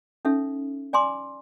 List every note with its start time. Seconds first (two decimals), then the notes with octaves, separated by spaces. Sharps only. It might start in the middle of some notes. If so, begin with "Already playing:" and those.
0.25 C#4 D#4 A4 E5
0.93 D5 G#5 A#5 C6 D6